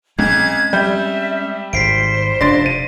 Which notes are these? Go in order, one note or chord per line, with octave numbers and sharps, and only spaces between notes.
B1 G#3 C4 C#4 G6 G#6
G3 E5 G6
G#1 C5 B6 C7 D7
F1 D4 C6 A6 A#6
D#7